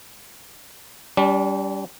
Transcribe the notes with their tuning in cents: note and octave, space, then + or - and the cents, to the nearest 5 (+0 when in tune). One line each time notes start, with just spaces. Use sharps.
G3 +0 D4 -45